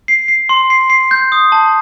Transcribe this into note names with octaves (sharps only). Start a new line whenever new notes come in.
C7
C7
C6
C7
C7
G6
D#6
A5